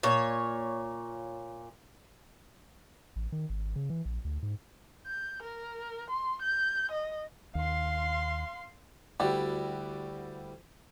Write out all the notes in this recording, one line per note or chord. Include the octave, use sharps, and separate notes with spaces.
A#2 C#5
A1
D#3
G#1
C#3
E3
A#1
D2
G#2
G6
A#4
C6
G6
D#5
D#2 F5 C6
D2 G3 E4 F#4 G4 D5